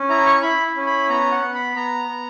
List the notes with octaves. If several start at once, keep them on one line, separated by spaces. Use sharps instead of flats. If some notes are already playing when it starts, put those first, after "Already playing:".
Already playing: C#4
E4 A#5
C#6
E4 B5
C#4
B5
B3 A#5
F#5
B3
B5
B3 A#5
B3